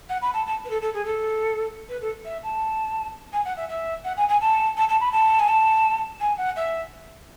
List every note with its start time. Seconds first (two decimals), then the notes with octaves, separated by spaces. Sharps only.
0.09 F#5
0.22 B5
0.34 A5
0.46 A5
0.65 B4
0.70 A4
0.82 A4
0.94 G#4
1.05 A4
1.89 B4
2.01 A4
2.25 E5
2.43 A5
3.33 G#5
3.45 F#5
3.57 E5
3.69 E5
4.05 F#5
4.17 G#5
4.29 G#5
4.41 A5
4.77 A5
4.89 A5
5.01 B5
5.12 A5
5.39 G#5
5.48 A5
6.20 G#5
6.38 F#5
6.56 E5